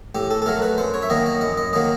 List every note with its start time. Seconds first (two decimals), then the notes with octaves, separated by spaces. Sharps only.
0.15 A2 G4
0.31 A4
0.42 A4
0.46 F#3 A3 A#4
0.62 B4
0.78 F#2 C5
0.94 C#5
1.03 E5
1.10 D#3 F#3 A#3 D#5
1.26 D#5
1.41 F#2 D#5
1.57 D#5
1.73 D#3 F#3 A#3 D#5